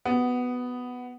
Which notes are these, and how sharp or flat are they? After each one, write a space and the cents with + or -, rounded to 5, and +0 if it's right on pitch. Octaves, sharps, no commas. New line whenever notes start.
B3 +5 F#4 +25